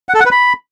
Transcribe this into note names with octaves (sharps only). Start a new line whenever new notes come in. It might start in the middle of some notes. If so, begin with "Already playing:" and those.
F#5
A4
F#5
B4
B5